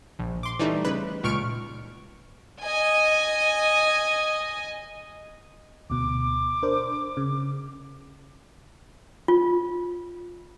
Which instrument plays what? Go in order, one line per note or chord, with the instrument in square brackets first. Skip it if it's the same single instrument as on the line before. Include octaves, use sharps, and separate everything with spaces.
[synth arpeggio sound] A#1
C6 D6
E3 G3 A3 D#4
C#3 B4 B5
C#2 A#2 C#6 F6 D7
[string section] D#5 G#5
[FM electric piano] D2 B2 [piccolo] D6
[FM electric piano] D4 A#4 C5
C#3
[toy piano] F4